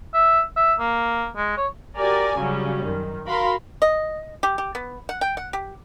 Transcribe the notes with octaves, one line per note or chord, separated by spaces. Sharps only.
E5
E5
A#3
G#3
C#5
F#4 G4 A#4 D5 G#5 A#5
C#3 F#3 G3 C#4
F#2 D#3
F#4 A#4 F5 B5 C6
D#5
G4
G4
B3
F#5
G5
F#5
G4